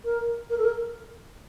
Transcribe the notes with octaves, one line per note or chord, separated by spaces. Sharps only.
A#4
A#4
A4
A#4